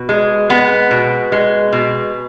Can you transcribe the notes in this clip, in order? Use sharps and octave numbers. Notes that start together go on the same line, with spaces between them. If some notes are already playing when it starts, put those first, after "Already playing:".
Already playing: B2
G#3
G#3 B3
B2
G#3
B2